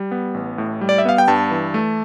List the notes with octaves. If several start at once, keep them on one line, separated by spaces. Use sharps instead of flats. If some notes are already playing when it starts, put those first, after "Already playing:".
Already playing: G3
B3
A1
A2
G3
D5
E5
B3 F5
G5
G2 A5
E3
A3